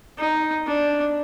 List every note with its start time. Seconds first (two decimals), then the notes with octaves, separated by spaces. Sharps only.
0.18 D#4
0.67 D4